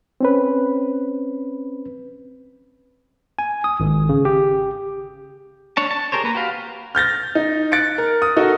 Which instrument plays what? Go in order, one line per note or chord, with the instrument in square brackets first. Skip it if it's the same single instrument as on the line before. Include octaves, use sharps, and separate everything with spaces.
[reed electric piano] C4 C#4 B4
[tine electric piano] G#5
D#6
G#1
C#3
G4
[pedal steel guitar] D4 C#5 A5
A5
G4 G#4 A#4 C5 C#5
A#3 B4 A#5
F#4 G4 B4 F5
[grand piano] F6 G6 A6 A#6
D#4
F#6 A6 C#7 D7
A#4
D#6
D#4 F#4 A4 A#4 D#5